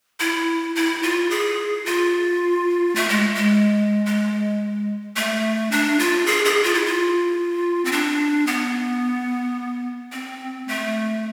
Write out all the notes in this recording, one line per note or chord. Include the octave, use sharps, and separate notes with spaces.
E4
E4
F4
G#4
F4
A3
G#3
G#3
G#3
A3
D4
F4
G#4
G#4
F4
E4
F4
C4
D4
B3
C4
A3